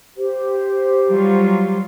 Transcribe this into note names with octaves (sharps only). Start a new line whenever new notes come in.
G4 C5
F#3 G3 F4